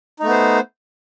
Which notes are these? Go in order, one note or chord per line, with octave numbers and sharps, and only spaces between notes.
A3 B3 D#4 C5